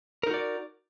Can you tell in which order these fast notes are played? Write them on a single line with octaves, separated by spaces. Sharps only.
A#4 D#4 F#4 D5